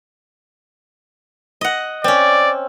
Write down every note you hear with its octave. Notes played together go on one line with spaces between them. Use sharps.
D#5 F#5
C4 C#4 D5